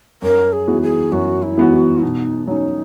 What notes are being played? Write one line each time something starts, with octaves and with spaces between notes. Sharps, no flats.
F#2 A#4
G#4
E3 B3 F#4
G#4
F#2 F#4
E4
E3 B3 F#4
G#4
F#4
B2 D#4
F#3 C#4 D#4